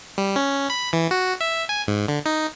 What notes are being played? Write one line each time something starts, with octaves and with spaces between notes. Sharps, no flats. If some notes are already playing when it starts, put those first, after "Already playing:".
G3
C#4
B5
E3
F#4
E5
G#5
G#2
D3
D#4